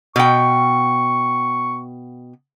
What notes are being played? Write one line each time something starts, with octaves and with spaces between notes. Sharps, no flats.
B2 G5 C#6